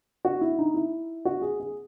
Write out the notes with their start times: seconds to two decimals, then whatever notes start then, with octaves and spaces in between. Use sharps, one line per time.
0.25 F#4
0.41 E4
0.59 D#4
0.74 E4
1.25 F#4
1.42 G#4
1.60 G#4